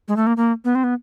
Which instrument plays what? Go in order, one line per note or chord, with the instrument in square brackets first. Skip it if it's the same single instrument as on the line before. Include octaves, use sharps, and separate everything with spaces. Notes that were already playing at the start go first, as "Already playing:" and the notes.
[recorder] G#3
A3
A#3
A#3
B3
C4
B3